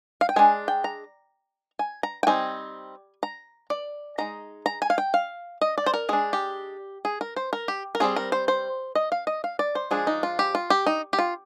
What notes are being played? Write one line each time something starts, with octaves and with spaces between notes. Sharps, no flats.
F5
G5
G#3 D4 G#5
G5
A#5
G#5
A#5
G5
G3 C4 D#4 G#5
A#5
D5
G#3 D#4 A#5
A#5
G#5
F5
G5
F5
D#5
D5
C5
A#4
G#3 D4 G#4
G4
G#4
A#4
C5
A#4
G4
A#4
G3 C4 D#4 G#4
A#4
C5
C5
D#5
F5
D#5
F5
D5
C5
F3 G#3 D4 G#4
D#4
F4
G4
F4
G4
D#4
G4
F4